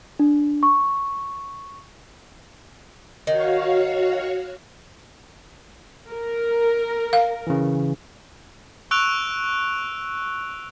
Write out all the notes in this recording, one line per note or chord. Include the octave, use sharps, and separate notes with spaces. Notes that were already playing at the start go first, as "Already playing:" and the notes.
D4
C#6
D#3 F#4 C#5 F5
A#4
F5
C#3 E3
C#6 E6 F#6 D7 F7